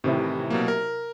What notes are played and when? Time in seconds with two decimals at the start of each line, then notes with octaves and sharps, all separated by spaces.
0.04 A2 C3 D#3 E3 C4 E4
0.50 B2 F#3 A#3
0.68 A#4